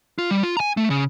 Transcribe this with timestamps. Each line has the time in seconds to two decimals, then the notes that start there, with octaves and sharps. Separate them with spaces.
0.18 F4
0.31 G3
0.43 F4
0.57 G#5 A#5
0.77 A3
0.90 C#3